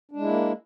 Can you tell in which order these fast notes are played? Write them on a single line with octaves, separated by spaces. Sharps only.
D4 G#3 E4 A#3